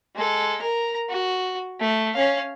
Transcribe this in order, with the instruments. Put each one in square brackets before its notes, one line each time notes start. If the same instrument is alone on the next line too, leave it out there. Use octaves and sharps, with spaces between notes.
[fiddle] G#3 A4
A#4 A#5
F#4
A3
C#4 F5